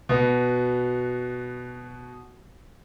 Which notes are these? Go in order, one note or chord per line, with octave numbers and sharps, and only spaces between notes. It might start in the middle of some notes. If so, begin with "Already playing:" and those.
B2 B3 F#4